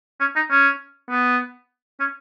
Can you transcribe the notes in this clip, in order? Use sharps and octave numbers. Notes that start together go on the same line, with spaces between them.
C#4
D#4
C#4
B3
C#4